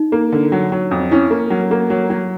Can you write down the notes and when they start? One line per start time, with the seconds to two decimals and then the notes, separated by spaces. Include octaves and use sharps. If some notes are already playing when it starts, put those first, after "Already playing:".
Already playing: D#4
0.12 A#3
0.32 D3
0.52 F#3
0.72 F#3
0.91 F2
1.11 C#4 E4
1.31 A#3
1.50 F#3
1.71 A#3
1.90 F#3
2.10 F#3